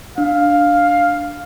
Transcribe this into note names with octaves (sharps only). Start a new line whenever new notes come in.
D4 F5